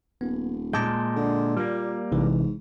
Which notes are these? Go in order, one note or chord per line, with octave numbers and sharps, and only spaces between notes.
D#1 B3
A#2 G#3 A5 D6 G6
D3
A#2 G3 A#3
A1 G#2 C3 E3